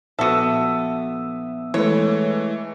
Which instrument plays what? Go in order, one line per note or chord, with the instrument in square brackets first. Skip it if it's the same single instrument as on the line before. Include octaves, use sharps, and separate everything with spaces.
[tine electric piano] A#1 B3 D#6 [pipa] F#4 A4 [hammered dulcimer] E5
[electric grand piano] E3 G#3 A3 [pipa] C#5